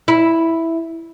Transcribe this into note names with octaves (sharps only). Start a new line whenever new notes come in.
E4